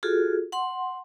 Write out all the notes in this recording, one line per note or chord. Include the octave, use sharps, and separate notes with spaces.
F4 F#4 G#4 A4
F#5 C6